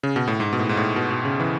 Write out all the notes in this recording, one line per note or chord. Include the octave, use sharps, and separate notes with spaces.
C#3
B2
A2
G#2
B2
A2
G#2
A2
B2
B2
C#3
E3